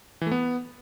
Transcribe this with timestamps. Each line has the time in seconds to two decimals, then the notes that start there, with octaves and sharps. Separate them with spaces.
0.21 E3
0.26 A3
0.31 B3